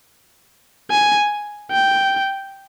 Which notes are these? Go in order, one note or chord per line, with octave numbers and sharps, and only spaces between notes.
G#5
G5